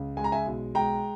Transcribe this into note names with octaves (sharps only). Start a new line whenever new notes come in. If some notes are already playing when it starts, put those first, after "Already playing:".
Already playing: C#2
G#3 G#5
A#5
E5 G#5
B1
G#3 G5 A#5